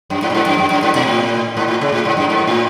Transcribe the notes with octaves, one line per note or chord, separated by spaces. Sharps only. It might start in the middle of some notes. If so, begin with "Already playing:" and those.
F#2
G#2
A2
G#2
F#2
F#2
F#2
G#2
B2
A2
G#2
A2
C#3
A2
G#2
F#2
G#2
A2